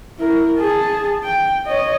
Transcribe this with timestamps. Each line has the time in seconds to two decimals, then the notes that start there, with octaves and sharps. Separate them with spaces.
0.19 E4 A#4
0.59 G#4 A5
1.23 G5
1.67 C#5 D#5